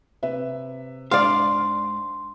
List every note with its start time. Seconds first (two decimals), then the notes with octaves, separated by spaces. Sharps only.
0.23 C3 B4 E5
1.11 G#2 D4 D5 F5 C6